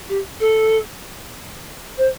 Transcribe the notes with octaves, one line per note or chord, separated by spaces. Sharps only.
G4
A4
C5